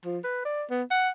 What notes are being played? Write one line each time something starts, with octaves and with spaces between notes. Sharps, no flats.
F3
B4
D5
B3
F#5